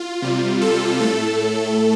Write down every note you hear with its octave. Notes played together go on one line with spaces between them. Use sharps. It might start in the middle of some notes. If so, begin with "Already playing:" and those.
Already playing: F4
C3 G3
A4
A2 A3 A4